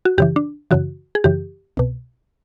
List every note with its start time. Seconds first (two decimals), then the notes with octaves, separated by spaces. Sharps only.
0.05 F#4
0.18 F#2 C#3 E3 G4
0.36 D4
0.71 F#2 C#3 E3 F#4
1.15 G#4
1.24 F#2 C#3 E3 G4
1.77 C2 B2